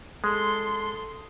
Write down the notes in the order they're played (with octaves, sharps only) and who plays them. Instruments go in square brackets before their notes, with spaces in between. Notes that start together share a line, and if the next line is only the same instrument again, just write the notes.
[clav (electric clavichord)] G#3 [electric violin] A4 C6